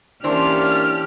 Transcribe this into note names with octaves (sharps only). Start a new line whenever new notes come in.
E3 A#3 C#4 D4 G4 C5 A5 F6